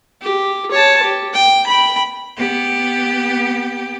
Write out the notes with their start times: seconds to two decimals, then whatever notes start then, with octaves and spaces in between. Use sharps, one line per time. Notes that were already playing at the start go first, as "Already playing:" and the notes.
0.22 G4
0.72 C#5 A5
1.03 G4
1.33 G5
1.67 G5 B5
2.36 B3 G4